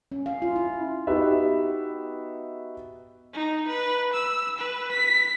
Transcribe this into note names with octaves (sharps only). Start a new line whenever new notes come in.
C#4
F5
F4
E4
B3 D#4 F#4 G4 B4 E5
D#4
B4
E6
B4
B6